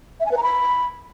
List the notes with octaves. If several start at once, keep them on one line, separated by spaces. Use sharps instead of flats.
E5
G#5
B4
A#5
B5